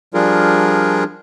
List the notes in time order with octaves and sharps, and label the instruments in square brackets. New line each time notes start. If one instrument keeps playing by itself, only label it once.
[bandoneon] F3 G3 D4 F4 G#4 A#4